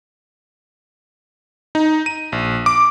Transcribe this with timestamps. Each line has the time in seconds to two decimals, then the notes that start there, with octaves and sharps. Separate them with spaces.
1.75 D#4
2.06 D#7
2.32 A#1
2.66 D6